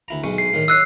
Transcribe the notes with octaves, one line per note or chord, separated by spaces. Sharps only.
D2 E4 A#5
B1 G#3 C#6
C7
A2 D#3
C#5 D#5 E6 F#6 C7